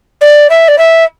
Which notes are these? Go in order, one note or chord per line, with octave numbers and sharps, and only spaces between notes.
D5
E5
D5
E5